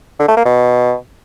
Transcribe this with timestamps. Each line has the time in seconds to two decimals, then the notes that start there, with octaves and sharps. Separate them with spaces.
0.20 D3
0.28 A3
0.37 A#3
0.45 B2